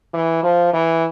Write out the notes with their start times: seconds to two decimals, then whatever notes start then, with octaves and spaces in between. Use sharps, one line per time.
0.14 E3
0.43 F3
0.73 E3